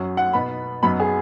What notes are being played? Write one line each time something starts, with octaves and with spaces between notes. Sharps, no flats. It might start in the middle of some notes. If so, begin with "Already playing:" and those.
Already playing: F#2 F#3 C#4
F#5
B2 B3 D#4 B5
F#2 F#3 B3 D#4 B5
G#4